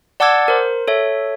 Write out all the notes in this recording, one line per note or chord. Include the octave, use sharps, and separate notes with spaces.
D5 F#5 A5 D6 E6 G#6
A#4 C5
A4 C#5 E5